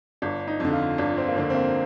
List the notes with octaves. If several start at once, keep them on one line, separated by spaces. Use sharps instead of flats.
G1 D4
D#4
F2 D3
F4
G1 D4
C4
A#3
F2 D3 C4
C4
A#3